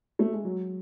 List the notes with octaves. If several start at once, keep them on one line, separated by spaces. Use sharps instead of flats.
A3
G#3
F#3